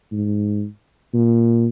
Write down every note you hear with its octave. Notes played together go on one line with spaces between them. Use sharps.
G#2
A#2